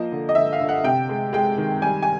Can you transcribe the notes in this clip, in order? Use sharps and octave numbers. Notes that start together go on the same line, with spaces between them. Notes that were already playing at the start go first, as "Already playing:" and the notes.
Already playing: F3 A#3 D#5
D3
D#5
D3 E5
F5
D3
F#5
C3 G5
G#3
G#3 G5
D#3
G3 G#5
G#5